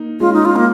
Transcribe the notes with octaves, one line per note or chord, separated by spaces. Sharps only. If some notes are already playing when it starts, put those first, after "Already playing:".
Already playing: A#3 D#4
G#3 C#4 F4
D#4
F4
A#3